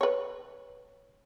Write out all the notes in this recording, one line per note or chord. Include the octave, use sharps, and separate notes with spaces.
B4 C#5